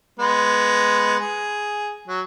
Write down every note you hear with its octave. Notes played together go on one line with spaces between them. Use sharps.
G#3 B3
G#4
F#3